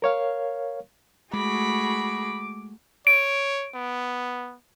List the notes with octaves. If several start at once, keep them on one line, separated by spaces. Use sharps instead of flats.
A#4 C#5 F5
G#3 A3 F#4 G#4 B5 D6
C#5 D7
B3